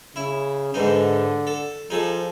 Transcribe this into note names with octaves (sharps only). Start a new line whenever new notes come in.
C#3 E4
G#2 D3 E3 D#4
A4
F3 D#4 G#4 A4